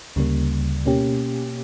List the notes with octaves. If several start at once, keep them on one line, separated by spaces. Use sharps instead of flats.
D2 C#3 G3 A#3
B2 A#3 C#4 G4